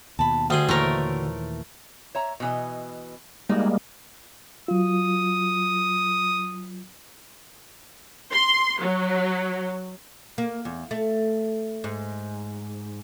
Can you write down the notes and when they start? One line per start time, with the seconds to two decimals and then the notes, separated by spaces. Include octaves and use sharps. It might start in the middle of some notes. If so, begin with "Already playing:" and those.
0.19 D#2 B2 A5 B5
0.50 D2 G3 G#4 C6 D#6
0.69 D#2 A#2 E3 A3 A#4 C5 C#5
2.15 C#5 E5 A#5
2.40 B2 E3 D#5
3.49 G3 G#3 A#3 D#4 E4 F#4
4.68 F#3 F4 D#6
8.32 C6
8.81 F#3
10.38 A#3
10.65 E2
10.91 A3
11.84 G#2